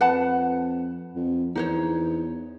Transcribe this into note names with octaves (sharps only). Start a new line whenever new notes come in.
F2 B4 F#5 A5
F2
E2 D#4 C5 C#5